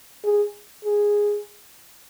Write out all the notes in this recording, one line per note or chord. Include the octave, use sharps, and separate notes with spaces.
G#4
G#4